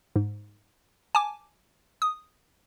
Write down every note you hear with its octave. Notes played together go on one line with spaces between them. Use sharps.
G#2
G#5 A5 D6
D#6